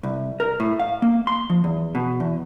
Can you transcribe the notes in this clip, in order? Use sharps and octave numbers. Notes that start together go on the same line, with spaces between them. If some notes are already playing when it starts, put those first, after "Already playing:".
C2
A#4
A2
F5
A#3
C6
F3
E2
B2
E2